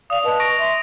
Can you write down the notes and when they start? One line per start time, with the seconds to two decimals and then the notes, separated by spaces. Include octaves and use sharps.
0.10 D5 F5 D#6 F7
0.24 B4 D#5 A5
0.40 C#6 A#6 D7
0.58 E5 C6